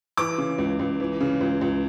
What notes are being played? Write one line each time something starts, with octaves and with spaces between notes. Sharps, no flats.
E3 D6
C#3
C#2
C#2
E3
C#3
C#2
C#2